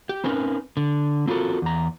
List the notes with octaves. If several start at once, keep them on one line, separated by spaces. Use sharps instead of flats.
G4
C4 C#4 D#4 A#4 B4
D3
C4 F4 F#4 A4 A#4
E2 A#5